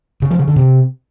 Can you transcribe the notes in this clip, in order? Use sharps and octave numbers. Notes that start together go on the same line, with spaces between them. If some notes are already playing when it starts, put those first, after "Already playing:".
C#3
F3
C#3
D3
C3